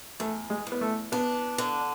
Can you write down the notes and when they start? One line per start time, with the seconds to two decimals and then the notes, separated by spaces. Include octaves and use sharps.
0.20 E2 A3
0.50 G#3
0.67 E2
0.72 B3
0.81 A3
1.12 B3 D4
1.58 D3